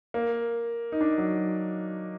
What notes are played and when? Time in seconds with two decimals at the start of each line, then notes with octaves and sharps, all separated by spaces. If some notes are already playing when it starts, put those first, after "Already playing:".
0.14 A#3
0.92 D#4
1.01 D4
1.18 F#3